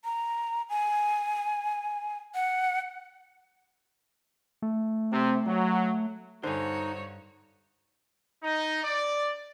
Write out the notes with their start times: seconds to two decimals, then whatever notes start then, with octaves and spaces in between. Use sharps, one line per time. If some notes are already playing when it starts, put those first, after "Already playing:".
0.05 A#5
0.70 G#5
2.35 F#5
4.62 A3
5.12 C3
5.46 F#3
6.43 G2 D3 D#4 F#4 C5 C#5 F#5 G#5
8.43 D#4
8.83 D5